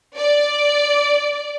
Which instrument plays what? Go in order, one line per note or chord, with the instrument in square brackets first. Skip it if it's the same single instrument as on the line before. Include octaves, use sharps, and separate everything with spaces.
[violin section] D5